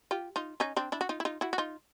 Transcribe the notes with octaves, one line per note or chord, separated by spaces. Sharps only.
F4 G4
D#4 F4
C#4 D#4
C4 D4
D4 E4
F#4
D#4 F4
E4
D#4 F4
E4 F#4
F#4
D#4 F4